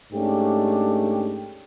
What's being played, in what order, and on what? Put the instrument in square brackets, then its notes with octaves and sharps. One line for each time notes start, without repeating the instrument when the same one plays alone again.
[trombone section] G#2 A3 C#4 D4 G4